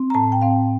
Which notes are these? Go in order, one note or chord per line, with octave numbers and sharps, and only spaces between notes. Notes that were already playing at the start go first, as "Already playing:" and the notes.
Already playing: C4
A#5
A2 A5
G5
C4 F5